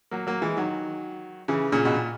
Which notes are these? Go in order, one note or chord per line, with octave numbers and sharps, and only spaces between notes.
F#3 A#3
F#3 A#3
E3 G#3
D#3 F#3
C#3 E3
A#2 C#3
B2
A#2